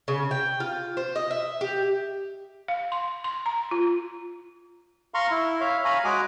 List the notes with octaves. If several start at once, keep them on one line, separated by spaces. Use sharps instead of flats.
C#3
G5
F4
C5
D#5
E5
G4
F5
C6
C6
A#5
F4
F5 A#5 C6 C#6
E4
C#5 E5 F5
C#5 F5 G#5 A#5 B5
G#3 F#4 G#4 G#5 A#5 D6